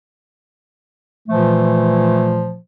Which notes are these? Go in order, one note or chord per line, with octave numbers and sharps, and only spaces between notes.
A#2 E3 F3 A3